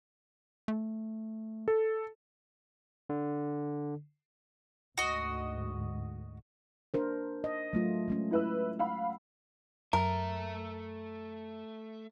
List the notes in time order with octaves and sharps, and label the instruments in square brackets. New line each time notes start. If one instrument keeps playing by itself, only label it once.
[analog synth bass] A3
[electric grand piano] A4
[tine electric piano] D3
[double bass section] D2 G#2 [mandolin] F#4 D#5
[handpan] D4 A#4 C5
D#5
F#3 A3 F4
G#3 A3 C#4
[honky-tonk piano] E4 B4 E6
F5 F#5 B5
[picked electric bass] F#2 [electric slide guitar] A3 E5 [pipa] A#4